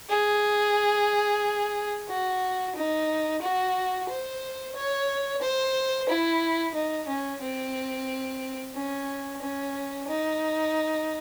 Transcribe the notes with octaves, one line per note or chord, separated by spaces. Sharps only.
G#4
F#4
D#4
F#4
C5
C#5
C5
E4
D#4
C#4
C4
C#4
C#4
D#4